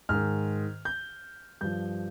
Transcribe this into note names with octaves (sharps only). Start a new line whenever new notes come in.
G#2 D#3 F6
G6
G2 F3 G6